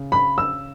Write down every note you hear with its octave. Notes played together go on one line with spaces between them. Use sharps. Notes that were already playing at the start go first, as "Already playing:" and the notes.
Already playing: C#3
B5
E6